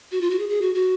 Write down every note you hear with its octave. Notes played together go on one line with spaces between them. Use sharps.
F#4
F4
F#4
G#4
G#4
F#4
F#4